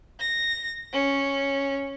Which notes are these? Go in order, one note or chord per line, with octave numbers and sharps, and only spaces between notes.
A#6
C#4